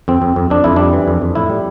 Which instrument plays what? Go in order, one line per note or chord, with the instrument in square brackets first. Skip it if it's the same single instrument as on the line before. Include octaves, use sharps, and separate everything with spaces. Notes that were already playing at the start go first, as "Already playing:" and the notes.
[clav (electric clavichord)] F2 C4
F2
F2
F2 D4
F2 E4
G3 D4
E3
F2
F2
A2 E4
G3